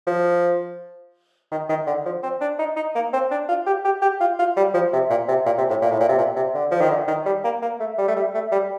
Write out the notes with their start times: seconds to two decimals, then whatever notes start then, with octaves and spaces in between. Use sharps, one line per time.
0.07 F3
1.52 D#3
1.69 D#3
1.87 D3
2.06 F3
2.23 C4
2.41 D4
2.59 D#4
2.76 D#4
2.95 A#3
3.13 C4
3.31 D4
3.49 F4
3.66 G4
3.85 G4
4.02 G4
4.21 F4
4.39 F4
4.57 G3
4.74 F3
4.93 C3
5.10 A#2
5.29 C3
5.46 A#2
5.58 C3
5.70 A2
5.82 A#2
5.91 A2
6.00 A#2
6.09 C3
6.18 A#2
6.36 C3
6.54 D3
6.71 F3
6.81 D#3
6.90 D3
7.08 D#3
7.26 G3
7.44 A#3
7.62 A#3
7.80 A3
7.98 G3
8.08 A3
8.16 G3
8.34 A3
8.52 G3